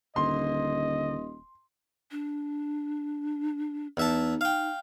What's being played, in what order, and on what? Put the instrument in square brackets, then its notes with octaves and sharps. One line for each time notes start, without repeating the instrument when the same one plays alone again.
[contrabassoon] D#1 [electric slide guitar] D3 [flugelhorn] D#5 [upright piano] C6
[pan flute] D4
[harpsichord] E2 E5 A5 [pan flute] D#4
[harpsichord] F5 G5